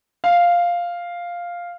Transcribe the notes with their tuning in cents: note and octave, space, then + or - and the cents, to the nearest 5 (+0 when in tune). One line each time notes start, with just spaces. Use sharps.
F5 +0